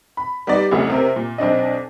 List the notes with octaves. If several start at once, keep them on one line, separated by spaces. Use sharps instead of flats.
B5
G3 B3 D#4 D5
C2 F2 C#3 A3
C3 C4 A#4
A#2
B1 C4 D4 D#5